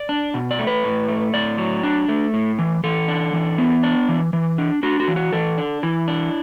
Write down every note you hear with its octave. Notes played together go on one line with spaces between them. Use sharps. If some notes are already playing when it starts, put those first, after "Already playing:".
Already playing: D5
D4
B2
D5
A3
B4
A2
A3
A2 D5
F#3
D4
A3
A2
E3
E3 A4
D4
E3
B3
D4
E3
E3
D4
D4 F#4
F#4
E3
F#4
E3 A4
D4
E3 E4
D4